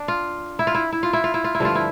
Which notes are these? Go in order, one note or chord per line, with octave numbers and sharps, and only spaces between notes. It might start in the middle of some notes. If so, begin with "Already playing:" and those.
Already playing: D4
F4
E4
F4
E4
E4
F4
E4
F4
E4
F4
E4
G2 D3 F3 A3 F4
E4